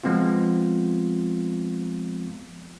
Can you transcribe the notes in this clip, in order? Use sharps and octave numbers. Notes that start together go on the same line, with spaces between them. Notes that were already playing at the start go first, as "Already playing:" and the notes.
F3 G#3 B3 C4 F4